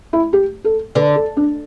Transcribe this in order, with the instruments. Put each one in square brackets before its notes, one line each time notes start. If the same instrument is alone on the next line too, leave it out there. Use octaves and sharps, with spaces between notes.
[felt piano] E4
G4
A4
[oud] D3 [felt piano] B4
[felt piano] A4
D4